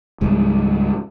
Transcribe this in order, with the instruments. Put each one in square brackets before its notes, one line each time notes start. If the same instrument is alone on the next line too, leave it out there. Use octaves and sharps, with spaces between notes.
[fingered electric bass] C#2 G#2 G3